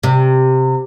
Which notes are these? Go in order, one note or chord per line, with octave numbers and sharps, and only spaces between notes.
C3